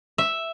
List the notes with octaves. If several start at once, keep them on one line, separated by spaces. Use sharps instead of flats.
E5